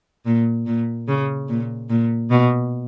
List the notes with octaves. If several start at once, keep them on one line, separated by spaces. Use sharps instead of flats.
A#2
A#2
C#3
A#2
A#2
B2